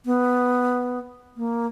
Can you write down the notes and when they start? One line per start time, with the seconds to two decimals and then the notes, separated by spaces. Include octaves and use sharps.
0.06 B3
1.37 A#3